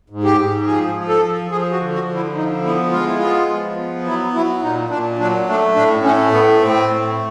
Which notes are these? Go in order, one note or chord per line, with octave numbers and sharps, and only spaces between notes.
G#2
G4
G#2
F3 G#4
F3
A4
F3
F3 G#4
F#4
D3
F#4
D3
E4
F3 D#4
B3 E4
G#3 F4
E4
B3 F4
F3
B3
F#3 E4
F#3 E4
A#2 D#4
A#2 D4
F#3 D4
A3 D4
A2 D4
A3 C#4
A2 B3
A2 C4
A3